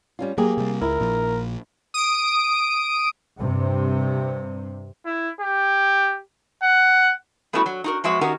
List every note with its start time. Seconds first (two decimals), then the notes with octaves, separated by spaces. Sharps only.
0.19 G3 C#4 F4
0.38 F#3 A#3 G4 G#4
0.57 C3 G3
0.81 C#2 E4 A#4
1.00 A#1 A#2 F3
1.94 D#6 D7
3.39 G2 C3
5.05 E4
5.41 G4
6.63 F#5
7.53 G3 A3 B3 C#4 E4 F#4
7.66 F#3
7.84 D#4 F#4 A#4
8.04 F3 F#3 G#3 B3 F#4 E5
8.21 D#3 C#4 D#4 F#4 G4 A#4